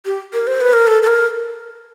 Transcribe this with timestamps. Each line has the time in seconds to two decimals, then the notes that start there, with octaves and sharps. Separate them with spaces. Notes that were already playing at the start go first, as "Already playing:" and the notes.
0.06 G4
0.33 A#4
0.47 C5
0.61 B4
0.73 A#4
0.87 A4
1.03 A4
1.07 A#4